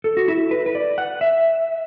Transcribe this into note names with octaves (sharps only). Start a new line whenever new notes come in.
A4
F#4
E4
B4
B4
D5
F#5
E5